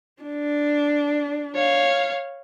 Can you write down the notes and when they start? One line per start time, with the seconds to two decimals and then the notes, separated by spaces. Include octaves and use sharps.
0.22 D4
1.55 C#5 F5